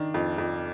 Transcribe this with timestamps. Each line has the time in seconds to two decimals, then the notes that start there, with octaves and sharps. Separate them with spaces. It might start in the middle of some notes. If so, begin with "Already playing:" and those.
Already playing: D#3 D4
0.14 F2
0.38 F2